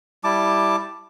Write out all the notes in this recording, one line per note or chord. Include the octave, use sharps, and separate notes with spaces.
G3 E4 A5 D6